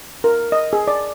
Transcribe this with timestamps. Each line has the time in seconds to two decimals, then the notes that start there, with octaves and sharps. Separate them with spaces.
0.24 A#4
0.52 D#5
0.73 G#4
0.88 D5